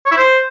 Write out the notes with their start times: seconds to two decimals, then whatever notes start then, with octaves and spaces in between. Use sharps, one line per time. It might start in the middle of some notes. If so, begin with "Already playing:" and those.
0.06 C#5
0.12 E4
0.17 C5